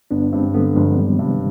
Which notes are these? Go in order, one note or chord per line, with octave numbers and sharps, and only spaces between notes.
G1 B3 D4
G2 G#3 C4
D3 G3 B3
G1 F3 G#3
G1 D#3 G3
G2 C3